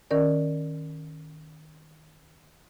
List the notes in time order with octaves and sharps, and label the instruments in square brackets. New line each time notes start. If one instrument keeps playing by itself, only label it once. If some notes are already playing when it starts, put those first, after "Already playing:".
[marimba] D#3 C#4 A#4 D5